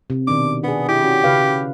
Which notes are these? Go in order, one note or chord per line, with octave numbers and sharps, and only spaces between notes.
C3
B2 D#3 D4 D6
B3 D4 G#4
E4 G4
C#4 F#4
C#3 B4 F5